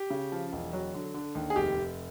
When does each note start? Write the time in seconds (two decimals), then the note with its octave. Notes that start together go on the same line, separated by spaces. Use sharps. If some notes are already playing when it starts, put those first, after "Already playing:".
Already playing: G4
0.10 C#3
0.32 F3
0.52 E1
0.73 F#3
0.94 D3
1.14 D3
1.35 D#2
1.50 G#4
1.56 F1 G4
1.77 F1